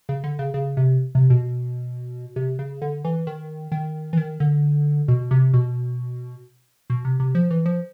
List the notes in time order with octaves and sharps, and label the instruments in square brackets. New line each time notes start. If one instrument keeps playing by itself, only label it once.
[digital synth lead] C#3
D3
C#3
C#3
C3
C3
B2
C3
C#3
D3
E3
D#3
D#3
E3
D#3
D3
B2
C3
B2
B2
C3
C3
F3
E3
F3